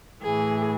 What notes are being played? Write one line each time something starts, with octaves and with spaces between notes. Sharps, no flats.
A2 E3 G#4